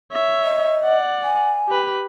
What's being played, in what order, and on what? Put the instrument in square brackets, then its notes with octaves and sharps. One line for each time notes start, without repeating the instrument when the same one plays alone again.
[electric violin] C#5 E5
[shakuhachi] D#5
[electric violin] D5 F#5
[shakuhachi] G#5
[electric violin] G4 B4